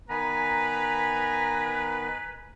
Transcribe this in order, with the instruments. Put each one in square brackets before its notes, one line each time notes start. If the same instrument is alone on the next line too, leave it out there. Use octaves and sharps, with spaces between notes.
[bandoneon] D#3 B3 [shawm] B4 [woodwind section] G#5 A#5